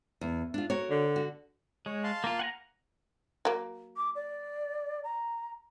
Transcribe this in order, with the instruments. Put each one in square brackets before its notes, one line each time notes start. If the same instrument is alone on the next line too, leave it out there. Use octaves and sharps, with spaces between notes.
[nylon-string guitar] E2
D4 F4
F#4 A#4 C#5
[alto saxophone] D3
[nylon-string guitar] F#4
[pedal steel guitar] G#3 [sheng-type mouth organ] C#5
[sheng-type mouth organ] F5 A5 C6
[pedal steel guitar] A#3 F4
F#5 G#5 A#5
[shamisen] F#3 A#3
[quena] D6
D5
A#5